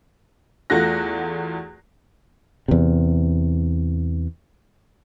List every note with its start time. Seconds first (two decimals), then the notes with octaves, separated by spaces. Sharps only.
0.70 E2 A3 F4 F#4 F#6 A#6
2.68 E2 C3